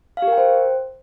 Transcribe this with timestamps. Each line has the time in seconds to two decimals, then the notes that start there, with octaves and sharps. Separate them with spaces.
0.17 F5
0.22 G4
0.27 A#4
0.33 G5
0.38 C5